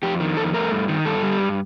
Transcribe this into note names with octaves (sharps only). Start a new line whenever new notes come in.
F2 G4
D#3
F2 A4
A3 A#4
G2
D#3
G2 A4
G3
G2